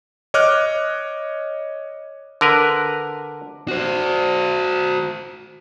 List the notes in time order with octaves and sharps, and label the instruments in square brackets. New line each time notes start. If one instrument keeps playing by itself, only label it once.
[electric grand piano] C#5 D#5 D6 F6 F#6
[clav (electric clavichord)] D3 A#4 B4
[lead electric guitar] F#4 C5